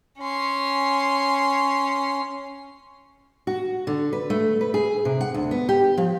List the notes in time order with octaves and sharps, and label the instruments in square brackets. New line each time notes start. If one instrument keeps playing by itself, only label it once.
[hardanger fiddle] C#4 C6
[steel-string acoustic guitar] F#4
D3
B4
A3
B4
G#4
C3
F#5
D2
B3
G4
F3